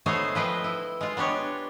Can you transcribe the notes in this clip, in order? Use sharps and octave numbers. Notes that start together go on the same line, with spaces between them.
A3 B3 G#4 C5 C#5 D#5
F3 B4 D#5 G5
E4
G#3 F4
B3 D4 G4 C#5